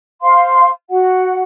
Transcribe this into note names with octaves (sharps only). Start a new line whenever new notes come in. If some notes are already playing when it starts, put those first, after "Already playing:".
C5 F5 C6
F#4 F#5